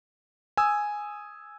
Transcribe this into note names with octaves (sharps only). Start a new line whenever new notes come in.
G#5 D#6 E6